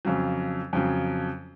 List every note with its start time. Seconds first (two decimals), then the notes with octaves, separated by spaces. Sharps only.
0.05 F2 C#3 F#3
0.73 F2 C#3 F#3